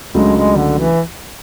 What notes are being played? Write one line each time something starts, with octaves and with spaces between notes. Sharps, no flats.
C#2 C#3 F#3 G#3 A3 D4
G#3
D3
E3